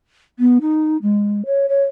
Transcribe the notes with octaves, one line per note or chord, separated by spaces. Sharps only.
B3
D#4
G#3
C#5
C#5